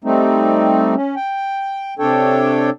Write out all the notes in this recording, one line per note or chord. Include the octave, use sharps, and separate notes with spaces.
G3 A3 C4 D#4
C#4
G5
C3 D4 A4 C#5 G5